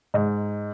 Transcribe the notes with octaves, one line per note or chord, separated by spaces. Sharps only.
G#2